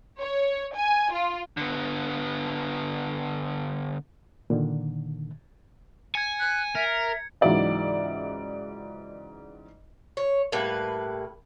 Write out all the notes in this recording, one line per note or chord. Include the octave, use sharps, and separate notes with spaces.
C#5
G#5
F4
D3 B3
A#2 D3 D#3
G#5 G#6 C#7
F#6
A#4 E5
C#2 G#2 E3 F#3 D5 E5
C#5
A2 G3 A#3 B4